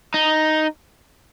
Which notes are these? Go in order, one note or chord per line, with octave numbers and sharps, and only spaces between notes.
D#4